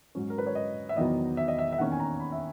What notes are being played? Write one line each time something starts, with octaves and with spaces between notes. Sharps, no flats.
G#2 F#3 C#4
A#4
B4
C#5
D#5
E5
E2 D#3 F#3 B3 D#5
E5
D#5
E5
E5
E2 D#3 A#3 C#4 F#5
G#5
A#5
B5
E5